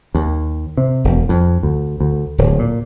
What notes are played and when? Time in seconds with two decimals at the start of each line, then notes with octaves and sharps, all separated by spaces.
0.15 D#2
0.77 C3
1.04 E1
1.29 F2
1.63 D2
2.00 D2
2.38 D1
2.59 A#2